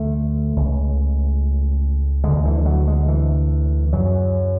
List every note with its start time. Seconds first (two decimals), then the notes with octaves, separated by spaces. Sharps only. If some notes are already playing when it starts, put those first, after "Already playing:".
Already playing: D2 D3 A3
0.56 C#2 C#3
2.24 D3 G#3
2.29 D2
2.45 E3
2.66 F#3
2.88 G#3
3.08 E3
3.92 F#2 C#3 F#3